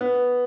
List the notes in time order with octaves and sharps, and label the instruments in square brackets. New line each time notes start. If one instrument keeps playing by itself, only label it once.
[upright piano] B3